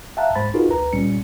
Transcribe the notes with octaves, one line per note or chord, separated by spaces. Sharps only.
E5 F5 G5 A5 A#5 F#6
G#2 G#3 C5 B5 A6
D#4 F4 F#4 G#4 A#4 B4
D2 B4 A#5
A#2 G3 C#4 C#7